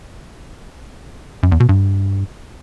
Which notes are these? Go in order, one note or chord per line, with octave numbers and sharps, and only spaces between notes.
F#2
E2
B2
G2